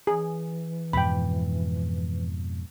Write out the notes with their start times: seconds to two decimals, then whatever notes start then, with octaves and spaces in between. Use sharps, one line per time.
0.07 E3 G#4
0.93 F2 G#2 B2 G5 B5